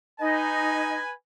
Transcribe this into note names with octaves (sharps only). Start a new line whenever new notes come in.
D#4 B4 D#5 G#5